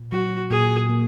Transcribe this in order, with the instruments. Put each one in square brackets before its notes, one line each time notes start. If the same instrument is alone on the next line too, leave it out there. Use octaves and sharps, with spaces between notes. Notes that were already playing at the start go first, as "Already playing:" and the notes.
Already playing: [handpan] A#2
[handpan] F#3 [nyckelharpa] F#4
[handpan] A#2 [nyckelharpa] G#4
[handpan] A#3